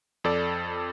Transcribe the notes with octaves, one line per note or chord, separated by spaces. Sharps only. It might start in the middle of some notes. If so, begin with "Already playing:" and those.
F2 A4 D5